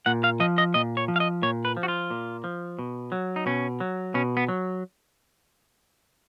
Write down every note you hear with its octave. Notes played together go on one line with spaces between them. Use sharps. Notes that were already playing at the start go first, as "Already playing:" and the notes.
A#2 F#5
F5
F3 D#5
D#5
A#2 D#5
C#5
F3
F5
D#5
A#2 C#5
B4
F3
F#4
F4
A#2
F3
B2
F#3
D#4
B2 C#4
F#3
B2 C#4
B3
F#3